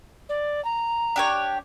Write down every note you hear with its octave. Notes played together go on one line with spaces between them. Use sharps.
D5
A#5
D4 G4 C#5